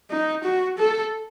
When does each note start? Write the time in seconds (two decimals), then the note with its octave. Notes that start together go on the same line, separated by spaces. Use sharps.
0.10 D#4
0.44 F#4
0.78 A4